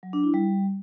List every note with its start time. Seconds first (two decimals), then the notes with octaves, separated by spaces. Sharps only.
0.03 F#3
0.13 D4
0.23 E4
0.34 G3